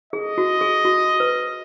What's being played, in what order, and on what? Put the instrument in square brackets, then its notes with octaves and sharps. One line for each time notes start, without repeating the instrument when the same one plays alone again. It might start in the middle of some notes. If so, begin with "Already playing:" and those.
[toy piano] G#4 [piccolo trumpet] D#5
[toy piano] F#4
G#4
F#4
B4